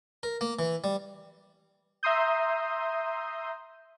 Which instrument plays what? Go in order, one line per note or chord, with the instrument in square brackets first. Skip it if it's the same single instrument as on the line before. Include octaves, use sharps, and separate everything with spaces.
[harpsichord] A#4
A#3
E3
G3
[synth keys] E5 A#5 C6 D#6 G6